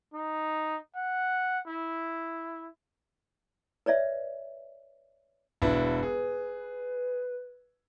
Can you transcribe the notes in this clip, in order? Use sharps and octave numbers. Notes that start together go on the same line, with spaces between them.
D#4
F#5
E4
B4 C#5 D5 E5
E1 D4 E4 B4
G#4